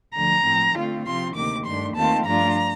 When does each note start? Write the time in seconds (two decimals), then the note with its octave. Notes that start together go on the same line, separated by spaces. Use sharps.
0.16 D2 D3 F3 A#5
0.46 A2 F3 C4
0.76 D3 A3 C4 F4
1.06 C3 F3 C4 F4 C6
1.35 D2 C3 D#3 A#3 D6
1.65 G2 D#3 A3 D4 C6
1.96 D#2 D#3 A3 C4 F4 A5
2.25 G2 F3 A3 D4 F4 A#5